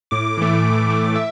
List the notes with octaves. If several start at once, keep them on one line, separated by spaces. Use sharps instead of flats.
A2 D6
E3 A3
A2
E3 A3
E5